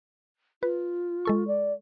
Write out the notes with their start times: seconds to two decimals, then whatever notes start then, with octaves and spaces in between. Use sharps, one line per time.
0.63 F4 B4
1.25 G#3 A4 C#6
1.48 D5